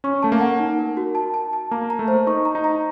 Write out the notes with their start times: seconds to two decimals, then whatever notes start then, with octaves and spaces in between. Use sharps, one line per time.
0.04 C#4 C#6
0.23 A3 A5
0.32 A#3
0.40 F#5
0.59 D#4
0.79 A#4
0.97 F#4
1.15 A5
1.34 A5
1.53 A5
1.71 A#3 A#5
1.90 A#5
1.99 A3
2.08 C5
2.27 D#4 C#6
2.45 A#5
2.55 D#4
2.64 A#5